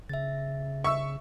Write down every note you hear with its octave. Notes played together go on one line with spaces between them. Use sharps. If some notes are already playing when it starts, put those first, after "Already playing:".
C#3 E5 A6
E5 C#6 E6